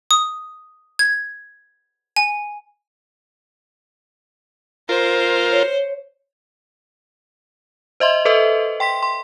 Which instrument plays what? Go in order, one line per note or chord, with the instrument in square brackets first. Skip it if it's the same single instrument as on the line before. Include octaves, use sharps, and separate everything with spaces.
[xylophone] D#6
G#6
G#5
[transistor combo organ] F4 A#4 [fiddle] C5
[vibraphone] C#5
[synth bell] C5 D#5 E5 C6
A4 B4 C5 D#5 E5
G5 C6 B6
C6